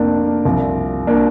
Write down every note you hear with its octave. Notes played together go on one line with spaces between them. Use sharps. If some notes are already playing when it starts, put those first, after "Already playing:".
Already playing: F1 F2 A#3 C4 D4
C2 C3 F3
A#3 D4